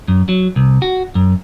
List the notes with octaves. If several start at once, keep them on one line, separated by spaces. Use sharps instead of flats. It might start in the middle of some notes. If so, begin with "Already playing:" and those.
F#2
F#3
C2
F#4
F#2